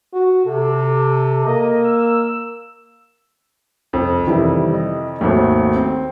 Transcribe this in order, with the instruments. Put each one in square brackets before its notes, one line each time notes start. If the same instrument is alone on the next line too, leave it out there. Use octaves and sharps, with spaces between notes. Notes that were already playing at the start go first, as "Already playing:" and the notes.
[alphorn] F#4
[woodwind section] C3 [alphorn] A4
[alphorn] A#3 [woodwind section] D#5
[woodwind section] E6
[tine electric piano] C2 [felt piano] F2
[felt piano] F2 C3 E4 [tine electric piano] D#3 E3 G3
[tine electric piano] D#5
[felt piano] G#1 D#2 [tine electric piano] A3 F#4
[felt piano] C4